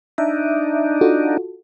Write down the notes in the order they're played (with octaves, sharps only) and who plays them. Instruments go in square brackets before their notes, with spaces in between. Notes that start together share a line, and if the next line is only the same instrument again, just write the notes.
[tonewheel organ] D4 D#4 [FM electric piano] E5
[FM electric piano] F4 F#4 A4